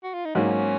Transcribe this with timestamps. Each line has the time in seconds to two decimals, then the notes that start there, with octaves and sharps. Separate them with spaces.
0.04 F#4
0.14 F4
0.25 D#4
0.35 G#2 F#3 A#3 C#4